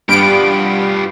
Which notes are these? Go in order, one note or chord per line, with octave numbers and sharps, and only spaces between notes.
G2 G3 B3 F4 G4 D7